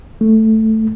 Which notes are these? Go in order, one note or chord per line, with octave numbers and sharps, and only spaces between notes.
A3